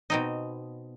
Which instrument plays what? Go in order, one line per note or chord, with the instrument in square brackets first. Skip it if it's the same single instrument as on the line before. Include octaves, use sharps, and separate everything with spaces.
[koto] B2 C4 D#4